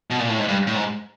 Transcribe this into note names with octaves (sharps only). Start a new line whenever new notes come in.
B2
A#2
A2
G#2
G2
A2
G#2